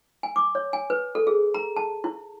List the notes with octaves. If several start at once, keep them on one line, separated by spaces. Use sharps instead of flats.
G#5
D6
C#5
G#5
B4
A4
G#4
A#5
A5
E4